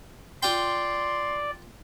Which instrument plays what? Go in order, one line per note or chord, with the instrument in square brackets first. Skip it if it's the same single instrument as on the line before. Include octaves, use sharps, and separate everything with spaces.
[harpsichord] F4 G5 [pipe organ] D5 [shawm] C6